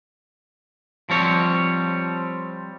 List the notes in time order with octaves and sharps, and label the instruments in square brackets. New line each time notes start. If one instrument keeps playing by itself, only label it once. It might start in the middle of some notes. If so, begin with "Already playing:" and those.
[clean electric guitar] F3 G3 C4 C#5